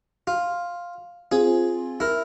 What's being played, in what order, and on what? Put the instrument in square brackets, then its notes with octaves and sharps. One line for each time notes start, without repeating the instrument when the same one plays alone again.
[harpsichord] F4
[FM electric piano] C4 F4 [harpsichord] G#4
[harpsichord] E4 A#4